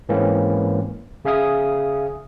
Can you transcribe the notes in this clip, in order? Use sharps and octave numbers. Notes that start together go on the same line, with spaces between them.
G#2 E3 G#3 A#3 C4 C#4
C#3 G#4 E5 F5 G#5 D#6